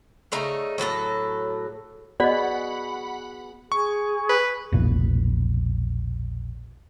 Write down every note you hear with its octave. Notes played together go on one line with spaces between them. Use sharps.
C#3 A3 D#4 A#5
A2 F#3 A4 A#5
B3 F#4 G#4 D5 D#5 F#5 B5
G#4 C#6
B4
E1 A#1